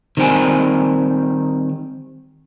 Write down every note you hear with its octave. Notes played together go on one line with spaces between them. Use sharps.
D#3 G3 C4 D4 G5 G#5